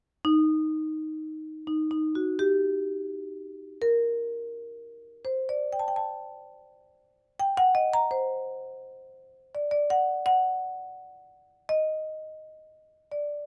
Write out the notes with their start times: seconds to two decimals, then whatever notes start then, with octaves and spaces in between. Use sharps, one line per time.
0.25 D#4
1.67 D#4
1.91 D#4
2.15 F#4
2.39 G4
3.82 A#4
5.25 C5
5.49 D5
5.73 G5
5.79 A5
5.88 G5
5.96 A5
7.40 G5
7.57 F#5
7.75 D#5
7.93 A#5
8.11 C5
9.55 D5
9.71 D5
9.90 F#5
10.26 F#5
11.69 D#5
13.12 D5